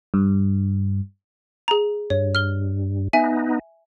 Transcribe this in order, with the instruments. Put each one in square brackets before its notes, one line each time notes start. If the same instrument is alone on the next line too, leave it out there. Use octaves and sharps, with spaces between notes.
[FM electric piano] G2
[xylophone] G#4 A#5
[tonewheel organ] G2 [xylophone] C#5
[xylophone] F6 G7
[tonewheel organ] B3 D#4 [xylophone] E5 G#5